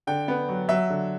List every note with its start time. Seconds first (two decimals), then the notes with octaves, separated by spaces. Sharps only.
0.07 D3 G5
0.28 B3
0.48 F#3
0.68 F#3 E5
0.89 D3